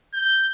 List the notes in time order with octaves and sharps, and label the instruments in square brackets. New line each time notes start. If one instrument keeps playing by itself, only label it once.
[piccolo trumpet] G6